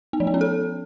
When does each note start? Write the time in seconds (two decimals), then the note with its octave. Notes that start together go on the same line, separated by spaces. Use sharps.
0.13 B3
0.20 F3
0.27 B3
0.34 C#4
0.41 A4